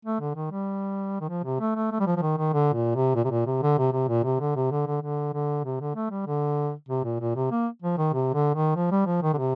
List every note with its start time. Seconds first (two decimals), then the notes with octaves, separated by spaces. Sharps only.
0.05 A3
0.21 D3
0.35 D#3
0.51 G3
1.21 D#3
1.29 F3
1.44 C3
1.60 A3
1.76 A3
1.91 A3
2.00 G3
2.07 F3
2.17 F3
2.22 D#3
2.38 D#3
2.53 D3
2.74 A#2
2.95 C3
3.16 A#2
3.25 C3
3.31 A#2
3.47 C3
3.63 D3
3.78 C3
3.93 C3
4.09 A#2
4.24 C3
4.40 D3
4.56 C3
4.71 D3
4.87 D3
5.02 D3
5.33 D3
5.65 C3
5.81 D3
5.96 A3
6.11 G3
6.26 D3
6.89 C3
7.04 A#2
7.20 A#2
7.36 C3
7.51 A#3
7.82 F3
7.98 D#3
8.14 C3
8.34 D3
8.55 D#3
8.75 F3
8.91 G3
9.07 F3
9.23 D#3
9.33 D3
9.37 C3